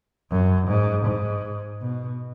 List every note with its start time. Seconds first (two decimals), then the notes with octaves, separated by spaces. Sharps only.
0.31 F#2
0.68 G#2
1.06 G#2
1.81 B2